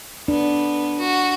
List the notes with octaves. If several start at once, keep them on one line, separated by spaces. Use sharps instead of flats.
B3 D4
F#4